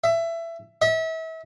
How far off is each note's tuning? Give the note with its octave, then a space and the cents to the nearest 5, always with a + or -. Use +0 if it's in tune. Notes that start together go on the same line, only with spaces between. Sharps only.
E5 +20
E5 -35